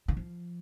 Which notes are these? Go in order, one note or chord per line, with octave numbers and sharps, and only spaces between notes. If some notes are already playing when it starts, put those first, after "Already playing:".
D#3
F3